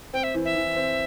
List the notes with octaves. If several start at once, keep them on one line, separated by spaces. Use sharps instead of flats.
C4 G5
E5
E3
E5
E3
C4